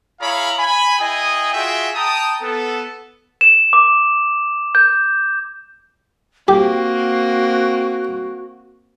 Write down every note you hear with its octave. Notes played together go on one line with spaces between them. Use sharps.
E4 G#4 C#5 F5 A#5 B5
G#5 B5
E4 G#4 D#5 G5 G#5 D#6
F4 F#4 G#4 E5 G5
G5 A5 A#5 D#6
B3 A4
E7
D6
G6
A#3 C4 F#4 G4